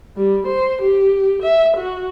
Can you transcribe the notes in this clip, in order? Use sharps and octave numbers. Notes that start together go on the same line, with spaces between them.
G3
C5
G4
E5
F#4